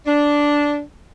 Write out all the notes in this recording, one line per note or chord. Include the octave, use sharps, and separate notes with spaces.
D4